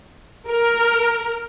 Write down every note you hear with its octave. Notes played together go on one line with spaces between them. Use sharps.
A#4